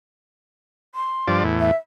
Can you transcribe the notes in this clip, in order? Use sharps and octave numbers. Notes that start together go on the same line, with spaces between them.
C6
G2 F3 D5
E2 A2
E5